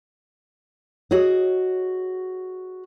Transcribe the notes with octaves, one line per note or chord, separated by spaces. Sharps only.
F#4 G#4 C#5 D#5